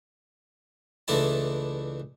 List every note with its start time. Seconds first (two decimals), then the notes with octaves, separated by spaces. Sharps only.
1.08 C#2 E3 A3 D4 E4 A5